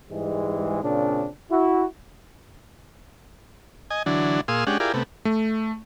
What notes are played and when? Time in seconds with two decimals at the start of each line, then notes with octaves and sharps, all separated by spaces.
0.10 G#2 E3 G3 G#3
0.83 A#2 C#3 C4 D4
1.50 E4 F#4
3.90 D#5 G#5
4.06 D3 E3 F#3 D4
4.48 A#2 G#4 F5 C6 D#6 E6
4.67 G#3 C#4 D4 G4 F#5
4.80 E4 F4 G4 G#4 A#4 D5
4.94 C3 A3 B3
5.25 A3